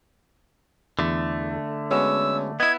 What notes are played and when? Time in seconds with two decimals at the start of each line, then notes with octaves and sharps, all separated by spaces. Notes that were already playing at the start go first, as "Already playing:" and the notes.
0.99 E2 D3 A3
1.91 G#3 B3 C#4 F#4 E6
2.60 B3 E4 D#5 G#6